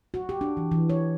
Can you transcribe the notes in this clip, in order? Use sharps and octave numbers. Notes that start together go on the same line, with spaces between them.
F#4
G4
D4
E3
E3
C#5